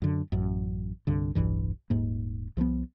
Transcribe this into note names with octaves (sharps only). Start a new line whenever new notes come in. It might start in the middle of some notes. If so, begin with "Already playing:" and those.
F#2 D3
A1 F#2
C2 G2 D3
E1 B1 G2 E3
D#1 G#2 A#3
C2 F3 F#3 B3